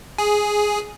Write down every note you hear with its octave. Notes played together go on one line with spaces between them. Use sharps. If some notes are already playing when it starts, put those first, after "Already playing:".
G#4